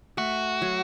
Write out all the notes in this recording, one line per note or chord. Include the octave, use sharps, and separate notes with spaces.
A3 F#4
F#3